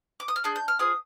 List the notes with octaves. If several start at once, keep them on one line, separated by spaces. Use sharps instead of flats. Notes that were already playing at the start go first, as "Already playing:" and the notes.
D6
D#6
F6
D4 G#4 G6
G6
F6
C4 F4 G#4 D#6